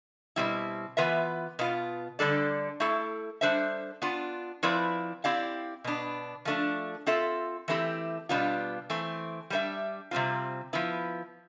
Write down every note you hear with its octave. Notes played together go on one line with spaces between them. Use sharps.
B2 G3 C4 E4
E3 B3 F4 B4 E5
B2 B3 F4
D3 G3 D4 A4 D5
A3 E4 A4
G3 D4 A4 C5 E5
B3 D4 F4
F3 C4 E4 B4 D5
C4 E4 G4 D5 F5
B2 B3 D4
F3 A3 D4
C4 F4 A4 E5
E3 A3 C4 E4 G4
B2 G3 B3 D4 F4
E3 A3 C4
G3 D4 G4 C5 E5
C3 G3 C4 F4
F3 B3 E4